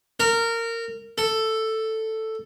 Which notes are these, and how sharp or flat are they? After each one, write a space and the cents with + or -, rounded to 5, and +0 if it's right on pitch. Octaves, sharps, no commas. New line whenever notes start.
A#4 -20
A4 +5